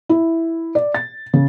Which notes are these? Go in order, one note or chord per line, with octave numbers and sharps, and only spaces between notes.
E4
D5
A6
C#3